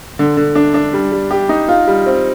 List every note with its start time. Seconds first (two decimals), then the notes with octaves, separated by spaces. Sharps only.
0.19 D3
0.37 D3
0.55 D4
0.74 D4
0.93 G3
1.12 G3
1.31 G4
1.49 D#4
1.68 F4
1.87 G3
2.06 C4